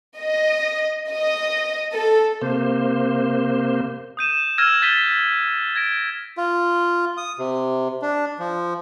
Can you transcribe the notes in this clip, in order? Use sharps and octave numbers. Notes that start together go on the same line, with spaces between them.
D#5
D#5
A4
C3 A#3 C5
D#6 G6 D#7 E7
E6 F6 G#6 A#6 D#7 E7
G6 A6 B6 D#7 G7
G#6 A#6 D7
F4
D#6
C3
D4
F3